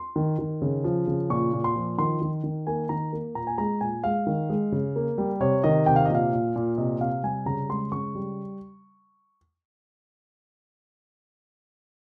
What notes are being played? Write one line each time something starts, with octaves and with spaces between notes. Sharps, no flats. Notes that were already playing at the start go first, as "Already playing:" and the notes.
Already playing: C6
D#3
D#3
C#3
F3
C#3
A#2 C#6
A#2
C6
F3
D#3 C6
D#3
D#3
A#3 G#5
D#3 A#5
A#3
A#2 A#5
G#5
G#3 A#5
A#2 G#5
G#3 F5
D#3
G#3
C#3
A#3
G3
C3 C#5
D#3 D#5
C3 G5
F5
A#2 D#5
F5
A#2
A#2
C3 D#5
C3 F5
G3 G#5
C#3 A#5
G#3 C6
C#3 C#6
G3